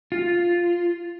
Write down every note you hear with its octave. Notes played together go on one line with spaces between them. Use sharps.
F4